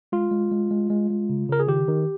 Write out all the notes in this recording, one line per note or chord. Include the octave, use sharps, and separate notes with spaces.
G#3 F4
G#3
G#3
G#3
G#3
G#3
C#3
C#3 A#4
G#4
D#3 G4
D#3